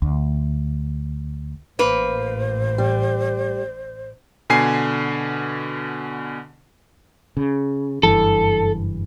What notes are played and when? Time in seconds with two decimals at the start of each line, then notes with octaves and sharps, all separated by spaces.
0.02 D2
1.79 A1 A#3 B4 C5
2.78 G3
4.50 B2 D3 G#5 C7
7.37 C#3
8.03 F#1 G2 E3 A4